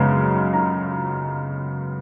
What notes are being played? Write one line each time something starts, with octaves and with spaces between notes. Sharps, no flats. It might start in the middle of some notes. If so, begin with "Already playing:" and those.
Already playing: F#2 C#3 G#3 B3 A#5
A#5